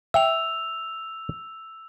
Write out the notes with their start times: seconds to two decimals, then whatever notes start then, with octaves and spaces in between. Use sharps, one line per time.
0.14 E5 G5 E6 F7